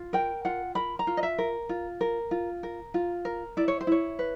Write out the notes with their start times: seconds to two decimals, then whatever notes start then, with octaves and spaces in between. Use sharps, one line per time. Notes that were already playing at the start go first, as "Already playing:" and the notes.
Already playing: F4
0.13 A#4 G5
0.45 F4 F#5
0.75 A#4 B5
0.99 A#5
1.07 F4
1.17 D#5
1.23 E5
1.38 A#4
1.69 F4
2.01 A#4
2.31 F4
2.63 A#4
2.94 F4
3.25 A#4
3.57 E4 D5
3.68 C#5
3.81 C5
3.87 E4 C#5
4.19 B4